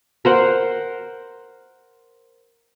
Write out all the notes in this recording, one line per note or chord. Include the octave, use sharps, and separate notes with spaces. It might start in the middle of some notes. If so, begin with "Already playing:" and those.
A#4 C5 F#5